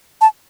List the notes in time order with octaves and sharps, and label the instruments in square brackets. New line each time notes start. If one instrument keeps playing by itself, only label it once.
[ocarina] A5